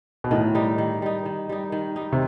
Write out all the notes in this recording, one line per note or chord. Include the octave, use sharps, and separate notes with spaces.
B2
A2 D#3
G3 D#4
D#3
G3 D#4
D#3
G3 D#4
D#3
G3 D#4
C3